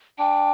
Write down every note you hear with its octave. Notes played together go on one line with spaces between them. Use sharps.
D4 G5